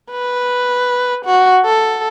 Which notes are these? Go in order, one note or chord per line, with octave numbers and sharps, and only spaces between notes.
B4
F#4
A4